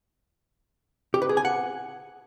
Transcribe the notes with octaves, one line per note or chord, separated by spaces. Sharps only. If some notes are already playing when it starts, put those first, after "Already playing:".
G4
B4
G#4
G#5
F#5